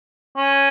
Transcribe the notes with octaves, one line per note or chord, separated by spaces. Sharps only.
C#4